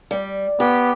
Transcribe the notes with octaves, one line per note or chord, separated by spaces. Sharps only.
G3
B3 G4